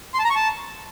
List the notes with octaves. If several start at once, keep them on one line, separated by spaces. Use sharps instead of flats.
C6
A5
A#5
C#6
A5